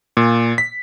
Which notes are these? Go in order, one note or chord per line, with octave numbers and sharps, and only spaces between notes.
A#2
B6